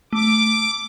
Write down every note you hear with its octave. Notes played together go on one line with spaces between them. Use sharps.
A3 D6